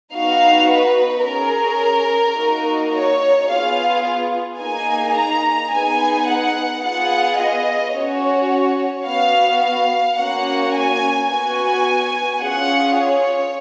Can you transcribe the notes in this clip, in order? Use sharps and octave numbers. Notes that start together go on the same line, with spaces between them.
B3 D#4 F#4 F5
B4
C#4 G#4 A#4
A#3 D#4 F#4
C#5
B3 F4 G#4 F5
A#3 D#4 G#4 G#5
A#5
B3 D#4 G#4 G#5
F#5
B3 F4 G#4 F#5
D#5
C#4 F#4 C#5
B3 F#4 F5
F5
A#3 C#4 F#4 F#5
G#5
B3 F#4 G#5
C#4 F4 G#4 F#5
C#5